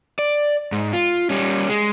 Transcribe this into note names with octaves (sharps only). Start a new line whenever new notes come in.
D5
G#2
F4
G3 C#4
G#3